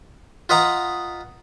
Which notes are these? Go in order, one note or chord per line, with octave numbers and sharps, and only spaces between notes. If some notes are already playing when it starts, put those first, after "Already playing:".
F4 B4 D#5 F#5 A#5